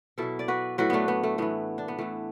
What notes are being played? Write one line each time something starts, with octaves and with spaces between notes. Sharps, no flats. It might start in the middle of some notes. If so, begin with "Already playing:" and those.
B2 F#3 E4 A4
D5
F#4 B4
A2 F#3 F#4 B4
A3 B3 D4
B3
A3
A2 E3 B3
D4
B3
A2 E3 A3